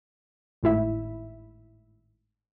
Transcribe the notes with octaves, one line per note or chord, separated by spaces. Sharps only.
G#1 A2 E4 E5